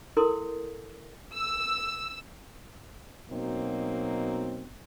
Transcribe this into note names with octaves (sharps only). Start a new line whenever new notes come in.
E4 A4 A#4 C6 D#6
E6
B2 F#3 A#3 C4 D#4